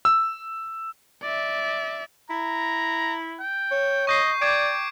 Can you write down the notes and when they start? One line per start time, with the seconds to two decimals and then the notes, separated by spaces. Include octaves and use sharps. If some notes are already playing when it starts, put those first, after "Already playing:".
0.05 E6
1.22 D5 E5
2.30 E4 A#5
3.40 G5
3.71 C#5
4.07 D#5 C#6 G6 C7
4.41 D5 G5 D6 G#6 D7